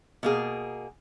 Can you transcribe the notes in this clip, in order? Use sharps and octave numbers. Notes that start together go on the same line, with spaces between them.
B2 A#3 G#4